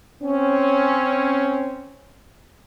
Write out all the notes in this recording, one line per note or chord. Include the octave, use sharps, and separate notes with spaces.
C4 C#4